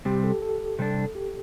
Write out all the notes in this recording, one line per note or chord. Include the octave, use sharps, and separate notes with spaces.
C3 G3 C4 G4
A4
A4
C3 G3 D4
G4